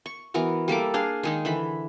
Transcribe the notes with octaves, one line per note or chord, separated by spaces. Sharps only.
C#6
E3 B3 F#4 A#4
G3 A#3 A4 D6
D4 G#4 F5
D#3 G#3 D#4
D3 E3 B5